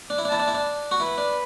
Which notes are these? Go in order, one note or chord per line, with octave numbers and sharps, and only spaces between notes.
D4
E4
D4
E4 A5
D4
E4
D4
F#4
E4 B4
D4